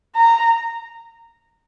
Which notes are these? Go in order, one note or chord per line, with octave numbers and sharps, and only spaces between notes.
A#5